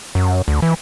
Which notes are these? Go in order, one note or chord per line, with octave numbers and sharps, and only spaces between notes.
F#2
D2
E3